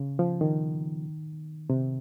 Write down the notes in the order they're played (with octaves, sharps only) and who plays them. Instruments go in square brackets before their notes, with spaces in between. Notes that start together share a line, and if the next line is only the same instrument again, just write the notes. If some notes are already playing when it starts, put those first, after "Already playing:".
Already playing: [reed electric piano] C#3
F3
D#3
C3